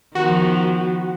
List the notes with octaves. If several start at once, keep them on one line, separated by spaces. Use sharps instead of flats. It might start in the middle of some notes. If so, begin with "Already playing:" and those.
D#3 F3 B3 F#4